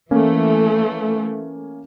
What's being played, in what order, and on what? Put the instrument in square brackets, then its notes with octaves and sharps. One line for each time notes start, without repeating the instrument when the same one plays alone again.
[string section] E3 A3 [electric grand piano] A#3 C#4